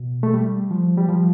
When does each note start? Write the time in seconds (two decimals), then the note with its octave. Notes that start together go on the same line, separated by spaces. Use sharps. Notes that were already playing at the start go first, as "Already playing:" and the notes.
Already playing: B2
0.23 A3
0.34 G3
0.71 F3
0.97 G3
1.08 F3